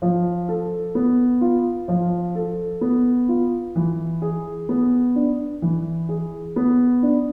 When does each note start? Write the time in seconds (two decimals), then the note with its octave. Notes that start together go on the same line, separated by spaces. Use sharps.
0.02 F3
0.49 A4
0.95 B3
1.41 F4
1.88 F3
2.35 A4
2.81 B3
3.29 F4
3.76 E3
4.22 G#4
4.69 B3
5.16 D4
5.62 E3
6.09 G#4
6.56 B3
7.03 D4